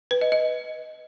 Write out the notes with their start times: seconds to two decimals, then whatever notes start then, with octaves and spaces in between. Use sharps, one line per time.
0.11 B4
0.21 D#5
0.32 D#5